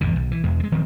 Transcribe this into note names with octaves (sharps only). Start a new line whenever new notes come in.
G#1 E2 D3
B1
E3
E1 E2 G#3
C3 G#3
D#1 D#3 F3 C4